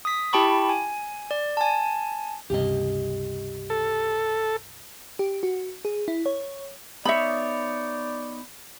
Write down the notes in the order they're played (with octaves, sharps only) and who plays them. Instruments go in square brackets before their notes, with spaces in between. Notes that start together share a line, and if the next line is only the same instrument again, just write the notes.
[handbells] D#6 B6
E4 G4 G5 A5 B5 C#6
G#5
D5
G#5 A5
[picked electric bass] C#2 G2 C3 [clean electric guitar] G4 D#5
[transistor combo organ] A4
[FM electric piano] G4
F#4
G#4
E4
C#5
[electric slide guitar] B3 D#4 C#5 [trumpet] D5 [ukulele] E5 B5